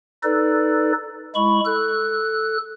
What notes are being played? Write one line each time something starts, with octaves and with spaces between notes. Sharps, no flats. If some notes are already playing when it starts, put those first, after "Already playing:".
D#4 A4 B4 D5
G#3 E4 B5 C#6
A4 F#6